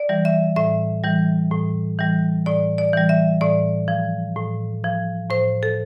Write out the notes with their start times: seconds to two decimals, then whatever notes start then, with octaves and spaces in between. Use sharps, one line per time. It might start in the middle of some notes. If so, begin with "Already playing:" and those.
Already playing: D5
0.09 E3 G3
0.25 E5
0.56 A2 E5
1.04 E3 G3
1.51 A2
1.99 E3 G3
2.46 A2 D5
2.78 D5
2.93 E3 G3
3.09 E5
3.41 A2 D5
3.88 F3
4.36 A2
4.84 F3
5.30 A2 C5
5.63 A4